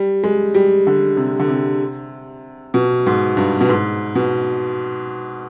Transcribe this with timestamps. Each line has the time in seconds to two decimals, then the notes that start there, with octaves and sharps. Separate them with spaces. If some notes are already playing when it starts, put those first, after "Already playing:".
Already playing: G3
0.24 G#3
0.54 G3
0.87 D3
1.17 C3
1.40 D3
1.48 C3
2.74 B2
3.06 G#2
3.37 G2
3.61 B2
3.69 G#2
4.15 B2